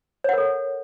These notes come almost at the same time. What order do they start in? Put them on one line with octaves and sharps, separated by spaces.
C#5 F#5 A#4 A4